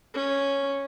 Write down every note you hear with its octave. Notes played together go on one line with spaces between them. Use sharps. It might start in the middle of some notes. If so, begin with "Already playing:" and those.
C#4